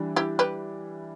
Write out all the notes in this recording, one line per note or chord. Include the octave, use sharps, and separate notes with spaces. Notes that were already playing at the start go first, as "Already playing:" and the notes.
Already playing: E3 G3 D4
E4 G4
G4 B4